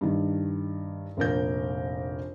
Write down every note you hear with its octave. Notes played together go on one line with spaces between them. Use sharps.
G2 D#3
F1 A#1 A#4 G6